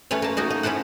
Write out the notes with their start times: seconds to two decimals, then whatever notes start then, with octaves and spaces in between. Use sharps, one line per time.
0.11 A3 C#4 B4 C#5
0.22 A#3 A5
0.37 A3 A#3 D#4 F#4
0.50 D#4
0.63 C#4 E4 A4 C5 F#5